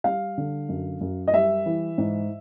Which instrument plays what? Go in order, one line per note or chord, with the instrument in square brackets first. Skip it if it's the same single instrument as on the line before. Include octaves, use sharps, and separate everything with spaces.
[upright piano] G3 F5
D3
F#2
F#2
D#5
G3 E5
E3
G#2